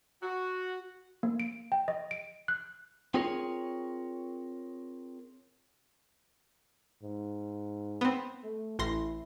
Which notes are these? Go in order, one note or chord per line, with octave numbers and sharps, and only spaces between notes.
F#4
A#3
D7
G5
D#5
D7
F#6
C4 F4 G#4 A#4 C#5
G#2
B3 C4
A3
A1 E4 C6 A#6